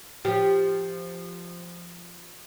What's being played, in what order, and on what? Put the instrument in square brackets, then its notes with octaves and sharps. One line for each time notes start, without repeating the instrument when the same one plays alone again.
[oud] F3 G4